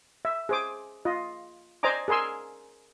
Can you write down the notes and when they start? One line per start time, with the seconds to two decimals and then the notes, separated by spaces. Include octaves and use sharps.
0.25 E5
0.49 G#4 C5 D6
1.05 F4 D#5
1.83 C5 D5 D#5 G#5 A#5 D6
2.08 G#4 A#4 G#5 C6 E6